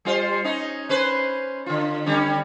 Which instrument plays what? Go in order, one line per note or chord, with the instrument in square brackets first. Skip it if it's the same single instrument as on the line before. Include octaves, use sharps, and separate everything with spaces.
[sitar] G3 F4 C5
C#4 D#4
C#4 B4 C5
D3 F4
D3 G3 C#4